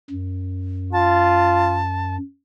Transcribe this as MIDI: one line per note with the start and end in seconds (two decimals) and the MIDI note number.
0.10 2.18 42
0.93 1.83 65
0.93 2.15 81